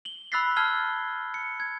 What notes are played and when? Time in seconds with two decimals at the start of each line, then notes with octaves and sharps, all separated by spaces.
0.05 F#7 G7
0.32 B5 E6 F#6 A6 B6 C7
0.56 A5 E6 F6 G#6 C7 G7
1.34 C#7
1.60 G#6